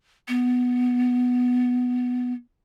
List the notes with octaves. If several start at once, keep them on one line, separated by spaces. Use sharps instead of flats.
B3